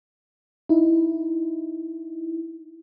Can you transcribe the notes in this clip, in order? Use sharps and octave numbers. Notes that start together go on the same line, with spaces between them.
D#4 E4